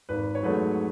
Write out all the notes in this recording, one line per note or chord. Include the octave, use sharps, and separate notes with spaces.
G#1 B4
C#5
G#2 F#3 A3 B4